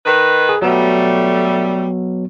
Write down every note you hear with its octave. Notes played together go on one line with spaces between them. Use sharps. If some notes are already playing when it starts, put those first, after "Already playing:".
D#3 B4
G#4
F#3 G3 A3 B3